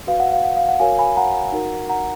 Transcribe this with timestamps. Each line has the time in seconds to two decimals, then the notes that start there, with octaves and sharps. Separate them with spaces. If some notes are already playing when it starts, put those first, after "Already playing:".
0.07 F#4 B4 F5
0.20 F#5
0.32 F5
0.44 F#5
0.57 F5
0.69 F#5
0.80 F#4 A#4 C#5 F5 G#5
0.98 G#5 B5
1.16 F#5 A#5
1.52 D#4 F#4 A#4
1.89 F#5 A#5